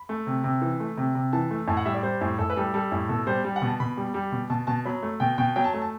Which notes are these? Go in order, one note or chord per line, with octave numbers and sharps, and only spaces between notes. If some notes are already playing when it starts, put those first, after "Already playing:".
Already playing: B5
A3
C3
C3
E3
A3
C3
C3
E3 A5
A3
A2 A5
F#5
G3 E5
D5
G3 C5
A2
A2 A4
B4
G3 A4
G3 A4
A2
B2 A4
G3 C5
G3
F#5
B2
A5
B2 B5
G3
G3
B2
B2 A5
B2 A5
F#3 B5
A3
B2 G5
B2 G5
F#3 G5
A5
A3
A5